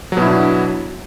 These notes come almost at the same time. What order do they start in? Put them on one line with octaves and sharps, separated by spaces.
F#3 B2 E4 D4